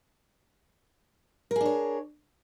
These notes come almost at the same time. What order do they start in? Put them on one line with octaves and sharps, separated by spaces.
A#4 G#4 D4 C#5